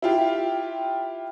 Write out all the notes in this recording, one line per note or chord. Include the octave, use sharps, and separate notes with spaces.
E4 F4 G4